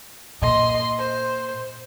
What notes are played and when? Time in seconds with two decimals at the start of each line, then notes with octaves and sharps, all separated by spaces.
0.42 A#2 D#5 C6
0.99 C5